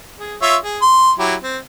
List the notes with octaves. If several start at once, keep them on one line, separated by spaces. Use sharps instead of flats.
G#4
F4 C#5 E5
G#4
C6
F#3 E4 G4
C4